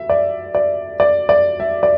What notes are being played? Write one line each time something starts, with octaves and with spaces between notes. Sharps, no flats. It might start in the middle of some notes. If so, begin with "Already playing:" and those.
Already playing: E5
D5
D5
D5
D5
E5
D5